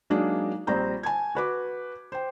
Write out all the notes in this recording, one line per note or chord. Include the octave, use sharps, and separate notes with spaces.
F#3 G#3 A#3 D4 D#4
A#1 G3 C4 C5 A#5 G6
G#5 A5 G#6
F#4 B4 D6
C5 G5